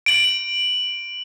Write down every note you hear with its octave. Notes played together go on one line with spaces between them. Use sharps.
D7 F#7